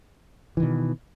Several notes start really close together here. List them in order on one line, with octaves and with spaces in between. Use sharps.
E3 D#3 B2